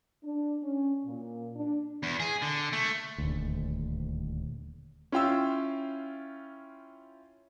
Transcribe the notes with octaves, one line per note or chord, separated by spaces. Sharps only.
D4
C#4
A#2
D4
E2
G#4
D3
A3
D#1 D2
C#4 E4 F4 G5 C6 E6